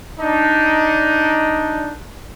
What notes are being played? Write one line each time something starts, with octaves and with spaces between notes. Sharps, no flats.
D4 D#4